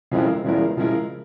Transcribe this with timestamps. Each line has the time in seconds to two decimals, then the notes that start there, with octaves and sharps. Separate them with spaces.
0.11 F2 C#3 F3 G#3 E4 A#4
0.44 E2 C#3 F3 G#3 E4 A#4
0.77 C#3 F3 G#3 E4 A#4